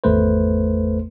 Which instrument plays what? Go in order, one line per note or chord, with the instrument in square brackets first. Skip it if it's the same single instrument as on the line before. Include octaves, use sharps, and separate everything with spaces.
[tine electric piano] G#1 E2 A3 B4 C5